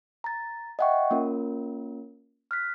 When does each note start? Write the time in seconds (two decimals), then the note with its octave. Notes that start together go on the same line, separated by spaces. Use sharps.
0.24 A#5 A6
0.79 D#5 E5 F#5 G5 C#6
1.11 A#3 C#4 F4 A#4
2.51 F6 F#6 B6